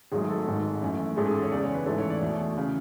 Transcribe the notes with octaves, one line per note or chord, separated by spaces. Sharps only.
G#1 G#2 F#3 A3 G#4
A4
G#1 G#2 G#3
F#2 E3 A3
A1 G#2 G#3 A4
G#4
A4
C#5
E2 C#3 G#3 D5
C#5
B4
A1 G#2 E3 A3 A4
C#5
D5
E2 B2 A3 D5
C#3 E3